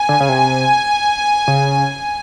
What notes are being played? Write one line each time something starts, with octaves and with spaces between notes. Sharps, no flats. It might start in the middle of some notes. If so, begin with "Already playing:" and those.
Already playing: G#5
D3
C#3
C3
C#3